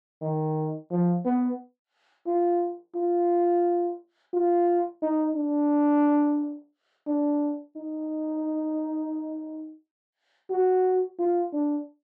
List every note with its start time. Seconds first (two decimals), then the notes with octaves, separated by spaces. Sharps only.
0.22 D#3
0.91 F3
1.25 B3
2.27 F4
2.95 F4
4.34 F4
5.02 D#4
5.36 D4
7.07 D4
7.76 D#4
10.50 F#4
11.19 F4
11.53 D4